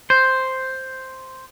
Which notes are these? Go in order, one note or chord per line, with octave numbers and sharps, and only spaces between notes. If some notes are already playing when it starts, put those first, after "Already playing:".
C5